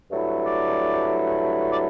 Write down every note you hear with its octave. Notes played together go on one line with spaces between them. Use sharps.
G2 F#3 A3 E4
D5
D5